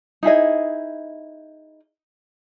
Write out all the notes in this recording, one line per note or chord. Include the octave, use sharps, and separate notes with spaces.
D#4 E4 G#4 D#5